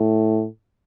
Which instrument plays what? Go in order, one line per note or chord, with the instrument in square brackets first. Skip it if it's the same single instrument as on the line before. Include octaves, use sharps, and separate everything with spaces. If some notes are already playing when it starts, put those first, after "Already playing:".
Already playing: [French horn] A2